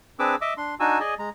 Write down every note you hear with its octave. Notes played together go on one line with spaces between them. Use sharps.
C4 D4 G#4 B4 D6 E6
D#5 E5 D6 E6
D4 C6
D4 D#4 F#4 G#5 E6
G#4 D5 D#5 G#5
G#3 A#5